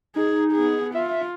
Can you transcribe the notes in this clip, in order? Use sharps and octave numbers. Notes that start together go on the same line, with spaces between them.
D#4 G#4
B3 G#4
F4 E5